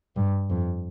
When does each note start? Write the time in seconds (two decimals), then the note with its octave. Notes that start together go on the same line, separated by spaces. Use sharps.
0.16 G2
0.50 F2